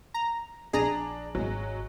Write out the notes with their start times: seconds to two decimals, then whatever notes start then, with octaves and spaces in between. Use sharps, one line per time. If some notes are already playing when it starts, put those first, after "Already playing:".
0.14 A#5
0.73 A#1 D4 G#4 A#5
1.35 G#1 F#3 G#3